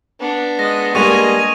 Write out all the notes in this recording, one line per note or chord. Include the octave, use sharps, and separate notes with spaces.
B3 D4
G#3 D#5 A#6
G3 G#3 A#3 D#5 G#5 C#6 D#7 F7